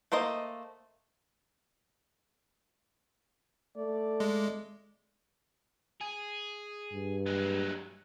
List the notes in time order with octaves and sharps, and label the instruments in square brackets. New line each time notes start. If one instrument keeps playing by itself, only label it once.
[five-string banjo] A3 A#3 C5 D#5
[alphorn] A3 [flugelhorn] D5
[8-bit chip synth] G#3
[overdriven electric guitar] G#4
[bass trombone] G2
[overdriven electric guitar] F#3 G#3